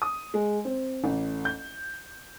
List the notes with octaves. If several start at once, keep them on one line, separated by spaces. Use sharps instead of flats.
D#6
G#3
C4
A1
G6